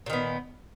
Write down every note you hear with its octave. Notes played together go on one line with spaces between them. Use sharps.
A#2 D#3 B3